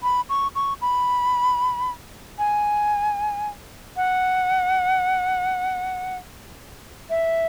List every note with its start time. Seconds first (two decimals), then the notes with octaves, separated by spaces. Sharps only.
0.03 B5
0.29 C#6
0.55 C#6
0.82 B5
2.39 G#5
3.97 F#5
7.10 E5